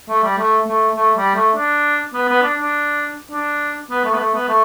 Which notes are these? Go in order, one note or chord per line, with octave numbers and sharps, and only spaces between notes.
A3
G3
A3
A3
A3
G3
A3
D4
B3
B3
D4
D4
D4
B3
A3
B3
A3
B3
A3